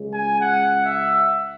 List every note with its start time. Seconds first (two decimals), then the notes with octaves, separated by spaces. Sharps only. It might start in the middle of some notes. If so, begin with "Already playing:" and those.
Already playing: C#2 C#3 G#3
0.11 G#5
0.41 F#5
0.84 E5